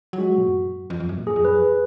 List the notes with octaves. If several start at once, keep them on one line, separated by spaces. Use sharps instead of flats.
F#3
G#3 F#4
F#3
A#2
F#2
F2
F2
F#2
A#2
G#4
F2
F#2 B4
F2